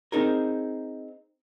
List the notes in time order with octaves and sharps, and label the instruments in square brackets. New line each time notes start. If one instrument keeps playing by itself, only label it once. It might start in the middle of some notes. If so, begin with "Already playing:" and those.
[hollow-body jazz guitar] C4 D#4 G#4 A#4